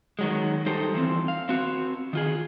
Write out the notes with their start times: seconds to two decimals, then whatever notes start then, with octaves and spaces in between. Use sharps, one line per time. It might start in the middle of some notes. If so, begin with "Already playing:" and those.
0.19 D#3 F#3 G#3
0.66 G3 D#4 G4 A4 C5
0.94 E3 F3 A#3 C4
1.28 F5
1.49 C4 F#4
2.13 D#3 F4 G#4